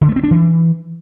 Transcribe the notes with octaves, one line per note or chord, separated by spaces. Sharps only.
D3
A3
C4
D4
E3